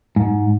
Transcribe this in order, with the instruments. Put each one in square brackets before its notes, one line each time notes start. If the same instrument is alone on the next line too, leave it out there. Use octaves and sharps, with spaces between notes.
[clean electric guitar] G#2